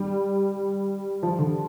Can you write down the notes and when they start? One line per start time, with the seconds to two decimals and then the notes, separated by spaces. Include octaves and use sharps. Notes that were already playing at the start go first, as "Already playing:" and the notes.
Already playing: G3
1.23 F3
1.39 D3